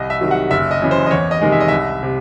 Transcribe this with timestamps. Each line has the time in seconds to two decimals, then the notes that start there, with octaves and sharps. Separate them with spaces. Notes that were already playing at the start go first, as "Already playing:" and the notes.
Already playing: C2 D#5
0.10 E5
0.21 C3 D#3 F#3
0.31 F#5
0.50 F#1 E5
0.71 D#5
0.82 F#2 E3
0.91 C5
1.06 D#5
1.11 E2 C#5
1.31 D#5
1.41 C3 D#3 G#3
1.52 E5
1.60 D#5
1.68 C2 E5
2.03 C3